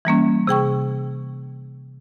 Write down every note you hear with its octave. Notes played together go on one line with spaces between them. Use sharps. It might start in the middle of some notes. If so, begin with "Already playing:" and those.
E3 G3 A#3 C#4
C3 G#4 G5 C#6